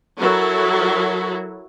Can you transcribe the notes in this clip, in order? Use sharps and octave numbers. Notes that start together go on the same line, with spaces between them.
F#3 E4 F#4 A4 A#4